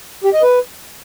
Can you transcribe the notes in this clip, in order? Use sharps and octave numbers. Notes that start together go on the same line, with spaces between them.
G4
D#5
B4